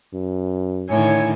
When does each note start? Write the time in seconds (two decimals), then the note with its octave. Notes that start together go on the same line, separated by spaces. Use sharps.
0.14 F#2
0.90 A2 D3 D#3 E4 C#5 G#5